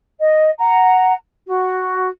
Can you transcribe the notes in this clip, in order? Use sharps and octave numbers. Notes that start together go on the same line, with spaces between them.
D#5
F#5 A#5
F#4